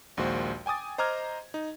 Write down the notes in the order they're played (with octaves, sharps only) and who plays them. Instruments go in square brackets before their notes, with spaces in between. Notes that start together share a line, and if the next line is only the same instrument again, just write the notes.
[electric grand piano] A#1 D#2 G#3 F#4 C5
G5 G#5 D6 D#6 A6
C5 D#5 A#5 D6 F6 G#6
D#4